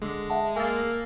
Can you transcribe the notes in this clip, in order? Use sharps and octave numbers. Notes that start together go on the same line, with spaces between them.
D3 G#3
E5 F#5 A5
A#3 G#5 E6 A6